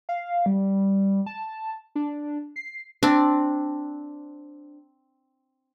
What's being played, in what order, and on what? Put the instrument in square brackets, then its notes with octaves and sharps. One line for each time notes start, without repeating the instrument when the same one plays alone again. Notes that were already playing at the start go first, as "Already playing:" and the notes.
[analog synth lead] F5
G3
A5
D4
C7
[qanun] C4 D4